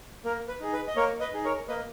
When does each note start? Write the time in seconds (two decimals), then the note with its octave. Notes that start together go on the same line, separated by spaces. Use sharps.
0.24 A#3 A#4
0.48 B4
0.61 D#4 G#4
0.73 B4
0.88 D#5
0.96 A#3 A#4 C#5
1.20 B4 D#5
1.33 D#4 G#4
1.45 A#4 C#5
1.68 A#3 B4 D#5